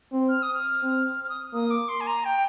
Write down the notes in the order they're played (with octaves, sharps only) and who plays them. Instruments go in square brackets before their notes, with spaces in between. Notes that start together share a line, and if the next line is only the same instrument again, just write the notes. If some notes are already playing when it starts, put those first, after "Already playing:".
[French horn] C4
[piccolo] F6
D#6
F6
[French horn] C4
[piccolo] F6
D#6
[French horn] A#3 [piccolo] D#6
[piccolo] D6
C6
G#5
A#5
G5